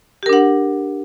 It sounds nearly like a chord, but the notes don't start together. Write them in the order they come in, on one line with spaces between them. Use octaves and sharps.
G4 A#4 D4 F#5